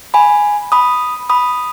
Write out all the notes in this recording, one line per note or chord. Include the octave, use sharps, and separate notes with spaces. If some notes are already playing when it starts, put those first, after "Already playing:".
G#5 B5
B5 D#6
B5 D#6